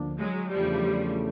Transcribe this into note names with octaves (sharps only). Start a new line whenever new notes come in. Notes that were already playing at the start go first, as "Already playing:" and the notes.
Already playing: D2 D3 F3 A#3 D4
F#3 G#3
E2 C#3 E3 F3 G3 A3 D4